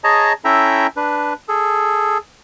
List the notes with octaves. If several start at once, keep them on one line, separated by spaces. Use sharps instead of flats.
G#4 C#5 D#5 A5 A#5
C#4 E4 A4 E5 G5 A#5
D4 B4
G#4 A4